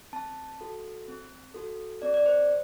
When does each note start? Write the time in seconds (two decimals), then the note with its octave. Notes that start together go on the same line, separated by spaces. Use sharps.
0.13 C4 A5
0.61 F#4 A4
1.08 C4
1.54 F#4 A4
2.02 C4 D5
2.14 D5
2.26 C5